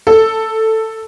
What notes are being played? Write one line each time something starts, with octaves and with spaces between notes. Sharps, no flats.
A4